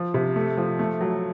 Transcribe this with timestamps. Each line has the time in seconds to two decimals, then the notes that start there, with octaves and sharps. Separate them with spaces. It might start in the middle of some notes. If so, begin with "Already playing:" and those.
Already playing: F3
0.14 C3
0.36 A3
0.57 F3
0.79 A3
1.01 F#3